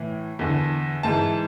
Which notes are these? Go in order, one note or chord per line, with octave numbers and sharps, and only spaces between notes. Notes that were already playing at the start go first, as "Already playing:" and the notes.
Already playing: A2 E3
E2 D3
G#2 E3 A5